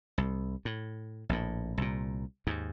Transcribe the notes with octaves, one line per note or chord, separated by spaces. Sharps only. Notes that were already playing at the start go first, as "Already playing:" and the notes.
C2
A2
A#1 A2
C2 A#2
D#2 G#2